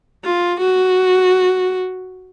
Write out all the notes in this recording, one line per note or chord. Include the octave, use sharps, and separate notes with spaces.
F4
F#4